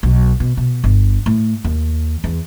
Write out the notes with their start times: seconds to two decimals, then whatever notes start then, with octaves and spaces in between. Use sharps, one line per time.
0.03 B1
0.40 B2
0.57 B2
0.84 G1
1.26 A2
1.64 D#2
2.24 E2